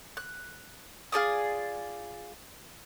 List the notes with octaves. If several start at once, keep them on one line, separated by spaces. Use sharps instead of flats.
F#6
F4 G#4 D5 D#6